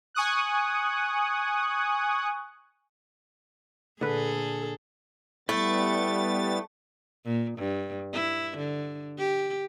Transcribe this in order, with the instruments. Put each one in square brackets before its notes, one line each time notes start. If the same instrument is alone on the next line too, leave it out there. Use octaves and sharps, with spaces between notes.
[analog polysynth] G#5 C#6 D#6 F#6
[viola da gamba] A#2 G#4 A4 [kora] D3 B4
[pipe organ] G3 B3 A6 [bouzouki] A3 [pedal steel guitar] E4
[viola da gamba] A#2
G2
E4
D3
G4